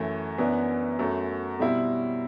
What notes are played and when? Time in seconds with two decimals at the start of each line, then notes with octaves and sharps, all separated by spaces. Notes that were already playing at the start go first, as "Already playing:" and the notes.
Already playing: F#2 E3 A3
0.38 F#2 E3 B3 D4
0.99 F#2 F#3 A3
1.59 B2 G3 C4 E4